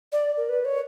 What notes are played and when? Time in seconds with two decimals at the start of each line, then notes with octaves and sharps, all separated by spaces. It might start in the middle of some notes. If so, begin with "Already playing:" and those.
0.12 D5
0.37 A#4
0.49 B4
0.65 C#5